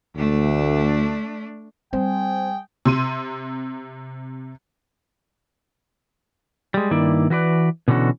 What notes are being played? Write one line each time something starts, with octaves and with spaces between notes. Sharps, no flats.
D2 A3 D4
G3 C4 G#4 C5 G5
C3 C6 D#7
G3 G#3
G2 D#3 A#3 E4 D5
E3 F#4 B4 D5
B2 D3 E3 C#4 F#4